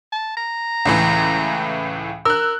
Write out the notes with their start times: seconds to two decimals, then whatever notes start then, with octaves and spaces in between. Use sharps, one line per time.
0.12 A5
0.37 A#5
0.85 C#2 A2 E3
2.25 A#4 E6 F#6